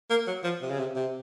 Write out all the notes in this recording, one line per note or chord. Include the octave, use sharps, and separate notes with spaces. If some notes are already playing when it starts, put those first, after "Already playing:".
A#3
F#3
F3
C3
C#3
C3
C3